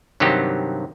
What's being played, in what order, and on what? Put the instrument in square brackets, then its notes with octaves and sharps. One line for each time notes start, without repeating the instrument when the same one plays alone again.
[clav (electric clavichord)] G2 C3 D#3 F#3 D#4 G4